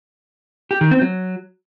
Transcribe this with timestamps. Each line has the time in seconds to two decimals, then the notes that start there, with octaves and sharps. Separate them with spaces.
0.71 G4
0.81 D#3
0.91 C4
1.01 F#3